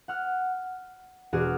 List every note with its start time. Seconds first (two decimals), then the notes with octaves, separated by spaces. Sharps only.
0.08 F#5 F6
1.32 E1 F#4 G#4 D5 F6